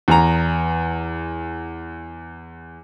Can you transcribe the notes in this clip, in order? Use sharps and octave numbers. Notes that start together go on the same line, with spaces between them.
E2 A#5